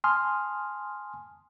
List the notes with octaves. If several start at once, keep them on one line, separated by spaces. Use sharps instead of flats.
G#5 A5 C6 D#6 F6